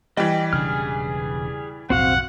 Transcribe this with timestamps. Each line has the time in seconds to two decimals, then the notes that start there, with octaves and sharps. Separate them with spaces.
0.17 E3 G3 D#5 G5
0.53 E1 C#3 D4 G#4 F6
1.90 B1 F2 A2 C4 F#4 F5 F#5